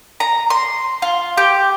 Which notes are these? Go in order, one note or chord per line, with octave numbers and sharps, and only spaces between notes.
A#5
C6
F4
G4